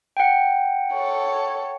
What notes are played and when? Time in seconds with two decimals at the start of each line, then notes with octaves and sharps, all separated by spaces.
0.17 F#5 G5
0.92 A4 C#5